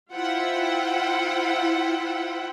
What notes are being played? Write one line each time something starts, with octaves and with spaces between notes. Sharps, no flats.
E4 F4 C5 F#5 G5